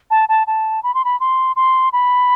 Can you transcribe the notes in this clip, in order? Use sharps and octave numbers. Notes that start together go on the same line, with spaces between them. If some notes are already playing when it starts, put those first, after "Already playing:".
A5
A5
A5
B5
C6
B5
C6
C6
B5